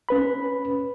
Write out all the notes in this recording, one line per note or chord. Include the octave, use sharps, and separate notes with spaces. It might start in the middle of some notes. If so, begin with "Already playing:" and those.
C#4 B4 B5